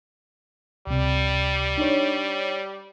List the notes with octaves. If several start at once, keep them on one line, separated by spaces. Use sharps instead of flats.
C#2 C3 G3
D4 D#4 C#5